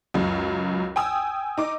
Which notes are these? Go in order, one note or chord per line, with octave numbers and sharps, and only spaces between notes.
C#2 F#2
G5 G#5 D#6 E6
D#4 D6